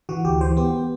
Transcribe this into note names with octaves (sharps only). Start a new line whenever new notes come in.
E3 F#4
D2 G4
E3 C5
B3 G4
B3